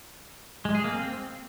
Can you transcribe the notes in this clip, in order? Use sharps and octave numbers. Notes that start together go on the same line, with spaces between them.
G#3
G#4
A#3
C4